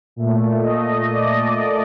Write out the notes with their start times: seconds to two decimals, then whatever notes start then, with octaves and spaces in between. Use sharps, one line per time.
0.16 A#2 A3
0.63 D#5
1.09 D5